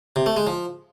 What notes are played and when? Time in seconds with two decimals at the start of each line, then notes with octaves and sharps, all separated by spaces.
0.16 C3
0.26 A3
0.36 G#3
0.47 F3